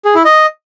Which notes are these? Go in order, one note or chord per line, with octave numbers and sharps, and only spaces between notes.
G#4
E4
D#5